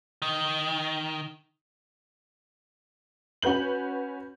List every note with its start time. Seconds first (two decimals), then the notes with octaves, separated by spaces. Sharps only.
0.22 D#3
3.42 C#4 F#4 B4 G6 F#7